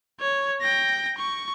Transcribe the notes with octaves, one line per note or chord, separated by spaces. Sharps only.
C#5
G5 A#6
C#6